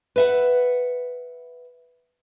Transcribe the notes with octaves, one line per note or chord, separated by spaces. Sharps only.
B4 E5 F#5